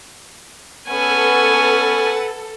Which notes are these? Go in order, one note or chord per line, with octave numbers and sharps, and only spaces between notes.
B3 C#4 A4 B4 F#5 G#5